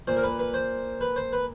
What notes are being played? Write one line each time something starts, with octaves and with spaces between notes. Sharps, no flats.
A#2 C5
A#4
B4
B4
C5
B4
C5
B4